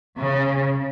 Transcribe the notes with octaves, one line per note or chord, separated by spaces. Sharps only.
C#3